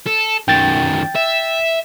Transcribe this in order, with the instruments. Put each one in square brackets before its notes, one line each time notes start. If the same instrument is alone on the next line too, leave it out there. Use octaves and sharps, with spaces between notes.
[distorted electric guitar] A4
[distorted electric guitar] F#2 D#3 [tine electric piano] G5 A6
[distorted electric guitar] E5